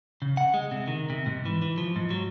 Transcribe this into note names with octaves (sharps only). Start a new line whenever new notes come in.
C#3
F#5
G#3
C3
D#3
C3
G#2
E3
E3
F3
G#2
F#3